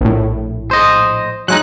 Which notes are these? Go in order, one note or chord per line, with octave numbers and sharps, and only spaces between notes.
A#1 A2
C5 D#5
F#3 G#3 D#4 F#6